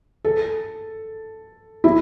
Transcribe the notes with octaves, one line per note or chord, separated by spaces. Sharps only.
A4
E4